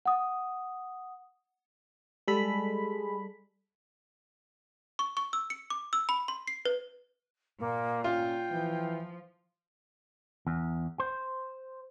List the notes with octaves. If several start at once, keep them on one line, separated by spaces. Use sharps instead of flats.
F#5 D#6
G3 G#3 A4 B5
C#6
C#6
E6
C#7
D6
E6
B5
C6
C7
B4
A#2 A#3
C#4 F4 G5
E3 F3
E2
C5